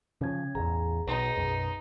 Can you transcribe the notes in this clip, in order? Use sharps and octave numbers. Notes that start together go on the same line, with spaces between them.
C#3 F3 C#4 G#6
A1 E2 G#4 A#5
B1 D#4 B4 C6
B1 F#2